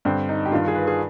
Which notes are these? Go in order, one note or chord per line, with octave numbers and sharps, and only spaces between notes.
G2 D3 C4
D#4
G4
G2 D#3 F4
G#4
B4
G#4